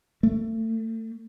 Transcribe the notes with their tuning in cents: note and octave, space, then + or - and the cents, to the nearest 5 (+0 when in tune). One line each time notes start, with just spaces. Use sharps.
A3 +30